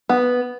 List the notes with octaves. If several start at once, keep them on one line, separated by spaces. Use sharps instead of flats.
B3